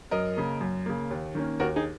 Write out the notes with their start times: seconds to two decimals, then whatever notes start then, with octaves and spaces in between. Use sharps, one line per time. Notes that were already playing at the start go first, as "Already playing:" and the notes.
0.11 F#2 A#4 D#5
0.37 C#3 A#3
0.61 F#2
0.86 C#3 A#3
1.11 D#2
1.35 D#3 A#3 C#4
1.60 D#2 F#4 A#4
1.76 D#4 G#4